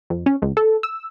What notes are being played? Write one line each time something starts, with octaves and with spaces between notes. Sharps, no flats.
F2
C#4
C#2
A4
E6